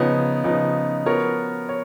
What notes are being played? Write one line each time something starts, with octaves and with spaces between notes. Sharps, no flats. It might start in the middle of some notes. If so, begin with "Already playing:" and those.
Already playing: C#3 F3 B3 D#4
C#3 F3 B3 D#4
F3 B3 F#4 A#4 C#5
C#5